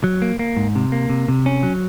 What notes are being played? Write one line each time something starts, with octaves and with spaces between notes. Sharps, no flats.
F#3
A#3
A#3
G#2
C3
A#3
C3
C3
C#4
F#3